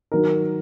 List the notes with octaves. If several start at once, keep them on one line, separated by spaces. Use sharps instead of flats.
D#3 F#3 A#4